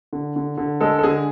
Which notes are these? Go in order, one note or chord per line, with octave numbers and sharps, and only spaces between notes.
D3
D3
D3
G#3 A4
A4
D3 G#4